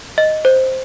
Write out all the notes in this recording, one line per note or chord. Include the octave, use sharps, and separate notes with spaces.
D#5
C5